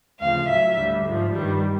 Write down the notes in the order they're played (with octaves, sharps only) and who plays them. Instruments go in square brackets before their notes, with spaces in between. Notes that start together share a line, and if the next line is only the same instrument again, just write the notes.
[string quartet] D2 C#3 F3 F5
A2 F#3 E5
D2 D3 G3
G#2 F3
G2 D#3 G3